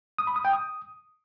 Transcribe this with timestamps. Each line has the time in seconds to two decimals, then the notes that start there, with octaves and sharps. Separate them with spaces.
0.18 D#6
0.27 B5
0.36 D#6
0.45 G5
0.53 D#6